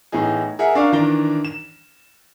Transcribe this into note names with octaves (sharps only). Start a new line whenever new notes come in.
A2 E3 B3 D#4 G#4
G#4 A#4 E5 F#5
D4 A#4 D5 F5 C#6
D#3 E3 D4 A#4 A#5 G7
E7